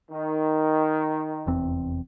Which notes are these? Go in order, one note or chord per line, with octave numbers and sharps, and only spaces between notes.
D#3
F1 E2 C4